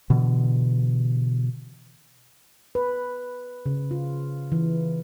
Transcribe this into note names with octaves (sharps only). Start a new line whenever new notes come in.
B2 D3 E3
B4
C#3
F4
E3